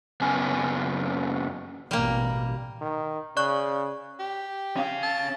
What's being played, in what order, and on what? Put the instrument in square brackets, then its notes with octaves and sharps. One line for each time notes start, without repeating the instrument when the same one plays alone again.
[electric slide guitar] F#2 C#3 B3 G#5
[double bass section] A1 B2 [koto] G3 A#3
[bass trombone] D#3
[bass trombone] C#3 [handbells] D5 C#6 F#6
[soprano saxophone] G4
[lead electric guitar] C#4 F5
[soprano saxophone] A5